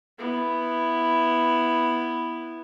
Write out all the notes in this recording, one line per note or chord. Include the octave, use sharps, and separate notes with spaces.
B3 E4